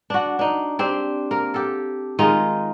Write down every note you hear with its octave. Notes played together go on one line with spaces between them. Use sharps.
D4 F#4
D4 D#4
C4 D4 G4 C5
A#3 A#4
G4 A4
D#3 G#3 D#4 F4